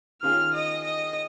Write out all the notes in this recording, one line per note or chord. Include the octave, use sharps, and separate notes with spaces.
D#3 C#4 F4 G#4 F6
D#5
D#5